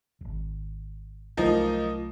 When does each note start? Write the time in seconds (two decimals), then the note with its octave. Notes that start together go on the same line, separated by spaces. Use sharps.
0.21 D1 G#1
1.37 C2 F3 F#3 A3 A#3 D#4